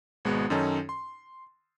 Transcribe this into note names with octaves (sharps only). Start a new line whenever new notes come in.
G#1 B2 G#3 B3 F#4
F#2 D#3 C#4 D#4 A4
C6